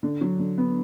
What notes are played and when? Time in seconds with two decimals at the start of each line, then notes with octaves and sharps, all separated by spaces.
0.03 D3
0.21 F#3
0.39 D3
0.58 B3